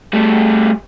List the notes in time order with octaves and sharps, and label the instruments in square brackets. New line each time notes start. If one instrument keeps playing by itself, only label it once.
[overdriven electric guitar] G3 A3